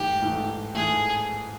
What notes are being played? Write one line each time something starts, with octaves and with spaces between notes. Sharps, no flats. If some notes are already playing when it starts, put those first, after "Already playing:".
Already playing: G#2 E3 A3 G4
G#2 E3 A3
G#2 E3 A3 G#4